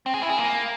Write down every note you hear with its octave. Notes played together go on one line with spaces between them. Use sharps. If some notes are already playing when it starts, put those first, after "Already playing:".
C4
G#4
E4
G#4
A#3